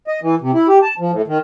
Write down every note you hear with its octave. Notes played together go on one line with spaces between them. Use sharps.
D#5
E3
C3
E4
G4
A5
F3
A2
D#3